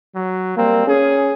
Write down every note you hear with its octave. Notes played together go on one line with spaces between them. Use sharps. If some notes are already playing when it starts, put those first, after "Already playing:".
F#3
G3 A#3 C4
C#4 G#4